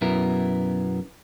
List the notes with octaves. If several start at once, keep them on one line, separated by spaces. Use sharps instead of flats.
F#2 B2 B3 E4 A#4